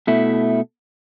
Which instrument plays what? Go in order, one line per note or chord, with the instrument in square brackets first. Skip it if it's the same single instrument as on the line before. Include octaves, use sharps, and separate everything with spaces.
[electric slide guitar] B2 A3 E4